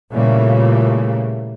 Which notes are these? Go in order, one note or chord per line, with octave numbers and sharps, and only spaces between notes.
A#2 C#3 E3 G3 A3 A#3